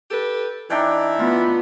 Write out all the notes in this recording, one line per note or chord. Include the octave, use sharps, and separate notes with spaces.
G4 A4 B4
E3 D4 D#4 E5 G5
B3 F4